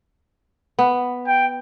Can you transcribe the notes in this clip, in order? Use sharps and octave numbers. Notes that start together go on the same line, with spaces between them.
B3
G5